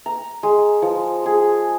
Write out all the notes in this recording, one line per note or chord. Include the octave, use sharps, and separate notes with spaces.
A#5
G#3
F3
G#4